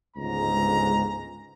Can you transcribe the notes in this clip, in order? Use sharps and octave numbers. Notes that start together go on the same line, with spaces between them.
G1 C#2 G#2 G#3 A#5